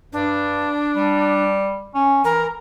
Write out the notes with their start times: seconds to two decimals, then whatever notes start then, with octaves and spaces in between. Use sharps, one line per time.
0.13 G2 D4
0.96 G3
1.94 C#4
2.24 E3 A#4